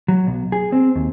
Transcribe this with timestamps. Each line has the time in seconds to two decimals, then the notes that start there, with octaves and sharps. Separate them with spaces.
0.08 F#3
0.27 B1
0.52 G#4
0.72 C4
0.95 D#2